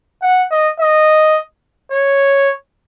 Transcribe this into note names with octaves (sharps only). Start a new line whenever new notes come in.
F#5
D#5
D#5
C#5